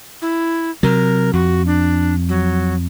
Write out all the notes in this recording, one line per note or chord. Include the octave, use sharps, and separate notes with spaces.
E4
C3 F#3 A#4
F2 F#4
D4
F#3